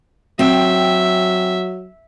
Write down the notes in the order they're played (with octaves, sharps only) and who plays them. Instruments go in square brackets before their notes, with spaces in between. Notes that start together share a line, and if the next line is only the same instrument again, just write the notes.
[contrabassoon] F#3 [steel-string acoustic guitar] C4 G5 [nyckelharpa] E5